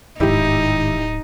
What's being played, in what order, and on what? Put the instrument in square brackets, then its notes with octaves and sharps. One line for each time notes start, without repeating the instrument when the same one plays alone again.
[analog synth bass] D1 [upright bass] G#2 D#3 [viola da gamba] D#4 [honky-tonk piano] E4 G4